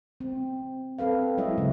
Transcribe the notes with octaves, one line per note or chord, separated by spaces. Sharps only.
C4
C4 A4 B4 F5
F#3 G#3 E4 C#5 D#5 E5
C#3 F#3 C4 C#4